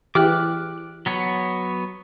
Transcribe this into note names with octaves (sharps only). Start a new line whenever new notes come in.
E3 G4 G#4 D6 F6 F#6
F#3 B3 C#5